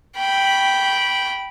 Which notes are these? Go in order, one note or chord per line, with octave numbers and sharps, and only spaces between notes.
G5 B5